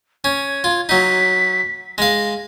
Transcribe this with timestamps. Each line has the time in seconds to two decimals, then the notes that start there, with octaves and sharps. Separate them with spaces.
0.24 C#4 G#6
0.64 F4
0.89 F#3 D#4 B6
1.98 G#3 F5 A#6